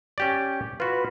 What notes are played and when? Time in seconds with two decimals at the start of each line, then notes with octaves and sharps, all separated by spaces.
0.18 C#4 G4 D5
0.80 F4 F#4 B4